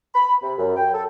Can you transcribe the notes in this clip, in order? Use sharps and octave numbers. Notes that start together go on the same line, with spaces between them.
B5
C3
F#2
G5
A4